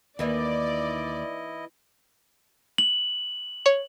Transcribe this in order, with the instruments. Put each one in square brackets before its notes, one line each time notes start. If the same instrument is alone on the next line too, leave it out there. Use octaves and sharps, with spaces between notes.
[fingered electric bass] D#2 [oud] E3 A#3 D#4 [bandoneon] E4 D#5 [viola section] D5
[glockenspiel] F#7
[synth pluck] C#5